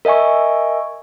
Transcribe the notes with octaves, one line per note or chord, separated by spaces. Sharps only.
A#4 D#5 E5 G#5 C#6